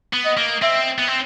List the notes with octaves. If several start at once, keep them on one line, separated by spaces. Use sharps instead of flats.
B3
D#5
A#3
C4 E5
B3
C4